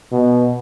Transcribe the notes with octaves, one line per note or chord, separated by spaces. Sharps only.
B2